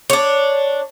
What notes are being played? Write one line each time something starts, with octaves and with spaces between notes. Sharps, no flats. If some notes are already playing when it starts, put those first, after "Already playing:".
D4 C#5